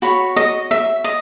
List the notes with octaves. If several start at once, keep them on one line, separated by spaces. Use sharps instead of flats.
F#4 C#5 B5
D#5
E5
D#5